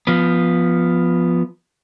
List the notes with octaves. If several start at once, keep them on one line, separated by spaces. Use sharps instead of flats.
F3 B3